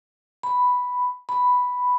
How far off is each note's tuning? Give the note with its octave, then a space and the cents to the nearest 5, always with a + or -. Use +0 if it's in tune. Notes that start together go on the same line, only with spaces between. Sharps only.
B5 +0
B5 +0